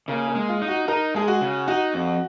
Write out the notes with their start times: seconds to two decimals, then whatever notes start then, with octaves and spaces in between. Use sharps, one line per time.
0.08 C#3 A#3
0.28 A#3
0.35 G#3
0.48 F4
0.62 D#4
0.68 F#4
0.88 D#4 A#4
1.15 G#3 G#4
1.28 F#4
1.41 C#3
1.68 D#4 F#4
1.94 F2